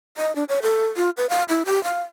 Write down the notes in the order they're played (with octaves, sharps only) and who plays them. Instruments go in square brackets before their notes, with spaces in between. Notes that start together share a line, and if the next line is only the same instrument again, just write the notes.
[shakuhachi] D#5
D4
C#5
A4
F4
B4
F5
E4
G4
F5